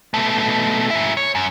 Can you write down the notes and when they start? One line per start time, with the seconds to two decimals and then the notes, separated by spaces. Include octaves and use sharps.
0.14 B2 A3
0.90 G#2 E4
1.17 C#5
1.35 F#2